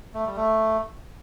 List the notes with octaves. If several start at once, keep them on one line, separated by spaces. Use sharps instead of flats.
A3
G3
A3